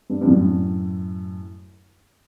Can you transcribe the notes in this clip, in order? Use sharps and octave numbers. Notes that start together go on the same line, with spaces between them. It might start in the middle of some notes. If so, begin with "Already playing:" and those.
G2
G2
F#2 A2